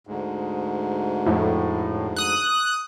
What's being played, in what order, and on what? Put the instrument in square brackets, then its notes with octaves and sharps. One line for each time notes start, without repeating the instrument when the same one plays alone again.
[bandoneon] D2 G#2
[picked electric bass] F2 [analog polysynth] A2
[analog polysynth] D#6 F#6